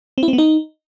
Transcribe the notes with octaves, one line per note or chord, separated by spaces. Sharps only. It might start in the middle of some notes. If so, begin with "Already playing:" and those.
C4
E4
C4
B3
D#4